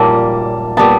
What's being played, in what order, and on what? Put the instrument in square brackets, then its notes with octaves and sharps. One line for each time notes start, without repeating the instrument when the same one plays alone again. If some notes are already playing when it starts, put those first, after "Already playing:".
Already playing: [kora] A#2 G3 A#3 [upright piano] A5
[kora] A#2 G3 B3 [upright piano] A5